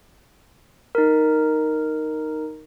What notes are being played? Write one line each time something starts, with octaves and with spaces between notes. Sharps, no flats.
D#4 A#4